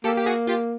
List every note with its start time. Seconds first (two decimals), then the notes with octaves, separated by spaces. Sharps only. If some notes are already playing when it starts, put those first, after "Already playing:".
0.04 A#3 G4 A4
0.18 G4
0.26 F#4 G#4
0.47 F4 G4